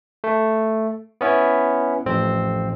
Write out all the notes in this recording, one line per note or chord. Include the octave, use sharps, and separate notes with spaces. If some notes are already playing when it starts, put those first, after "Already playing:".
A3
B3 C#4 E4
A1 F2 C4